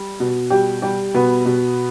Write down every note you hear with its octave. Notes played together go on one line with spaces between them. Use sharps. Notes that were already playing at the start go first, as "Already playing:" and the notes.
Already playing: G3
B2
G3 G4
G3 G4
B2 B3
B2